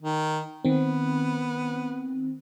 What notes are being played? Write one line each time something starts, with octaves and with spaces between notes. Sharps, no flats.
D#3
D#3 B3 C4